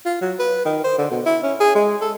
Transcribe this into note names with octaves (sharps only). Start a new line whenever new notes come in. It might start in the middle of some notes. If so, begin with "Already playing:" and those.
F4
F#3
B4
D#3
C5
D3
B2
E4
C#4
G#4
G#3
A4